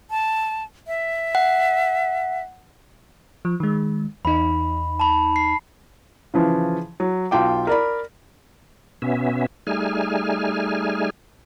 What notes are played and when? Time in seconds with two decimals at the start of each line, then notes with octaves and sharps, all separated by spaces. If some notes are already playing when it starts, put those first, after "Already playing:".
0.10 A5
0.87 E5
1.35 F#5
3.45 F3
3.60 D#3 G#3
4.25 E2 D#4 B5
5.00 A5 B5
5.36 C7
6.34 C#3 E3 F3
7.00 F#3
7.31 B1 F4 G5 D6
7.67 A#4 D5 B5
9.02 B2 B3 C#4 E5
9.67 G3 A3 D#4 G#4 G#5 F6